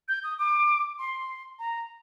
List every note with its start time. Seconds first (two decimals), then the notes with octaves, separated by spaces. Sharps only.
0.08 G6
0.24 D#6
0.39 D6
0.99 C6
1.59 A#5